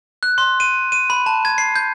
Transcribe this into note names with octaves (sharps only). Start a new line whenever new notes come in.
F#6
C6
D#7
D#7
B5
A5
G#6
C7
G6